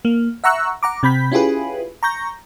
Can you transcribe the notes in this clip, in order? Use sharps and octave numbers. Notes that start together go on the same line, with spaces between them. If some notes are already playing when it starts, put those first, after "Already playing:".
A#3
E5 F#5 A#5 C#6 E6 F#6
F#5 A#5 D6
C3 C4 B5 G6 B6
C#4 E4 F4 G4 G#4 B4
A#5 C#6 G6 A#6